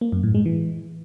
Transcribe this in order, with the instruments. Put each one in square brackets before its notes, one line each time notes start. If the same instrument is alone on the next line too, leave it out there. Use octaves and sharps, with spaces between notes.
[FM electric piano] A#3
F#2
A2
G#3
E3